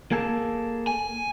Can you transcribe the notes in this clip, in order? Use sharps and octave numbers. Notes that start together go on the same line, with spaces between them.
A#3 G#4 A4
G#5